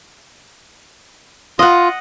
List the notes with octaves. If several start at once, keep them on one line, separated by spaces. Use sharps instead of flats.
F4 D#5 F#5